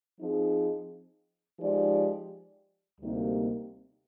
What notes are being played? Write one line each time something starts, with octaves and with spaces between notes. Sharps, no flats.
F3 C4 D#4 G#4
F3 G#3 D#4 G4 D5
D2 C3 G3 A#3 D#4